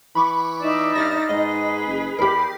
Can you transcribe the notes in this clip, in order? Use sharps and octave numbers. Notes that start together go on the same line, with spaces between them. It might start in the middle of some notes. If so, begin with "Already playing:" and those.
E3 B5 C#6 D6
D#4 D5 E5
G2 F6 A6 A#6
G#2 G#4 B4 D#5
F#1
E2 G4 A#4 B5